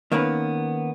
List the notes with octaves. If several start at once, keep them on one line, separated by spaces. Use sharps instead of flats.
D#3 A#3 B3 C#4 B4